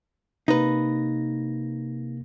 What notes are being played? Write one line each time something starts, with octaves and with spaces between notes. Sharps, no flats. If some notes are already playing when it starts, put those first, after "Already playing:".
C3 A#3 D#4 B4 A#6